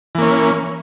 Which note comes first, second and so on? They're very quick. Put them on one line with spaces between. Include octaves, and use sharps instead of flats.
E3 A#3 C#4